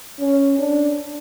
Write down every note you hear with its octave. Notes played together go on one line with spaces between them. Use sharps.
C#4
D4